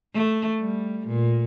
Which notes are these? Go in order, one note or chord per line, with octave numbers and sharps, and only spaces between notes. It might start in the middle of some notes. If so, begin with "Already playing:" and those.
A3
G3
A#2